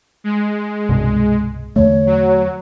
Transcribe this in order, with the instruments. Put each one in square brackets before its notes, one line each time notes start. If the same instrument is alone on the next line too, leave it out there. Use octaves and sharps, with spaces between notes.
[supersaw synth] G#3
[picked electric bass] C2 G2 B2
[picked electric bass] E2 D3 A3 [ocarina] C#5
[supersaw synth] F#3